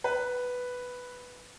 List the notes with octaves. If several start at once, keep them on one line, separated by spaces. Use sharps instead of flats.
B4